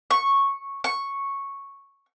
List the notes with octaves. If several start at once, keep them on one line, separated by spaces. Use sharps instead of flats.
C#6
C#6